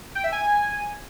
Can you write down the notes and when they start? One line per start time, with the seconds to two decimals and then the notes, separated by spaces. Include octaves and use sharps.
0.15 G5
0.24 E5
0.32 G#5